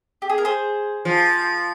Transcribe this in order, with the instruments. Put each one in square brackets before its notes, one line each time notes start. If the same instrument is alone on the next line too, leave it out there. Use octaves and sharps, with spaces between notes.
[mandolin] G4
G#4
A#4
G#4 C5
[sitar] F3